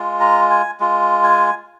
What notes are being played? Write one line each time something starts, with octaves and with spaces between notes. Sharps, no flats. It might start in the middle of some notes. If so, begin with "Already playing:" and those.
Already playing: G#3 F4
A#5
G#5
G#3 F4
G#5